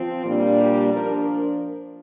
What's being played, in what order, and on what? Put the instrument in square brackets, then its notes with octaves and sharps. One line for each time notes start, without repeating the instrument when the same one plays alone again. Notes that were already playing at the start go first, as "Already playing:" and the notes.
Already playing: [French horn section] F3 C4 F4
A#2 G3 A#3 D4
G4
F3 D4 A#4
A#4